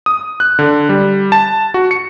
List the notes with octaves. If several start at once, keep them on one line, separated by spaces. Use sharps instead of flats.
D#6
F#6
D3
G3
A5
F#4
C#7